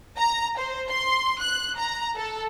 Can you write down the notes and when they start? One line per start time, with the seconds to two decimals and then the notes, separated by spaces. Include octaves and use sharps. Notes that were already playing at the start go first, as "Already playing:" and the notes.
0.17 A#5
0.58 C5
0.89 C6
1.40 F#6
1.76 A#5
2.16 A4